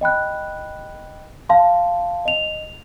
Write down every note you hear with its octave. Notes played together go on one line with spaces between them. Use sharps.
D#5 G5 B5 F#6
F5 A5 C6
D#5 F7